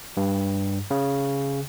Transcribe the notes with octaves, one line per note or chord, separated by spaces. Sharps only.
G2
C#3